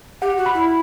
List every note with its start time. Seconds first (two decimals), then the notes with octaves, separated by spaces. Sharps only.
0.22 G4 F#5
0.38 F#4
0.46 B5
0.54 E4